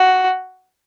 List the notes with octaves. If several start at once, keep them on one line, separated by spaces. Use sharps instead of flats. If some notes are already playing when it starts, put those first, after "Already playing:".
Already playing: F#4